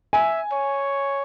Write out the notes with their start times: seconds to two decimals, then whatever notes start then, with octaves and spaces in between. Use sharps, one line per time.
0.13 E5 G#5
0.53 C#5